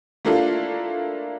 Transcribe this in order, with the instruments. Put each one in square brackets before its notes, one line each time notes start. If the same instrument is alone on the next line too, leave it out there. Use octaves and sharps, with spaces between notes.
[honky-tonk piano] A3 A#3 D4 E4 F4 A4